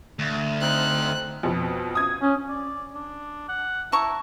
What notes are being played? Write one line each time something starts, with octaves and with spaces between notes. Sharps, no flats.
D2
C4 D#4 F6 F#6
F2 B2
D#6 G#6
C#4
D5
D4
F#5
E4 A5 A#5 C#6